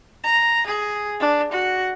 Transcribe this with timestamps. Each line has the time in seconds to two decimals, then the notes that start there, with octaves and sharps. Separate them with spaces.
0.24 A#5
0.67 G#4
1.20 D4
1.52 F#4